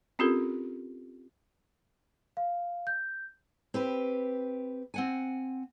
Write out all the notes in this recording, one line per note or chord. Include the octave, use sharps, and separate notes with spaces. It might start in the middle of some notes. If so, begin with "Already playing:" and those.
C4 C#4 F4 G4 A4 A#4
F5
G6
C4 G4 B4
C4 F#5 G#5